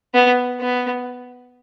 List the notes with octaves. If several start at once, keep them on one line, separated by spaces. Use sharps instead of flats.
B3
B3